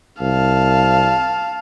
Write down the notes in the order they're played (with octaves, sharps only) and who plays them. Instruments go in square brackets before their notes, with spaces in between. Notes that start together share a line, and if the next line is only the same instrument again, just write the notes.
[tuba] C2 [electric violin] F5 A5